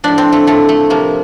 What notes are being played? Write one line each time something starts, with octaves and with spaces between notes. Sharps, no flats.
A2 F3 D4
C4
A3
A2 F3 A3
A3
C3 F3 A#3